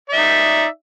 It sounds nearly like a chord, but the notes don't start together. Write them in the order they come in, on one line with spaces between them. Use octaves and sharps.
D5 E5 D#4